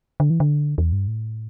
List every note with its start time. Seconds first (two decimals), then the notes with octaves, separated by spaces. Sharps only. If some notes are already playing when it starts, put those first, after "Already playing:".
0.20 D3
0.30 E3
0.40 D3
0.78 E2
0.93 G2
1.08 A2